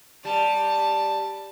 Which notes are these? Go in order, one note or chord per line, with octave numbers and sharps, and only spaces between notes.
G3 A5